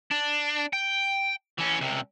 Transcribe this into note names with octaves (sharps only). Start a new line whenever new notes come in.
D4
G5
E3 C#4
C#2 C3